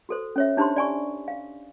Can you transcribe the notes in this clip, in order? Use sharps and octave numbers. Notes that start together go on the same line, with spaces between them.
F#4 A4 C5
C#4 C#5 E5
D4 D#4 G4 C5 B5 C6
D5 G#5 C#6
F5